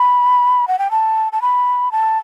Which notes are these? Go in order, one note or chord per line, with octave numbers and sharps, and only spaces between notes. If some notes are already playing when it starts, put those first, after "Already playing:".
Already playing: B5
F#5
G5
A5
A5
B5
A5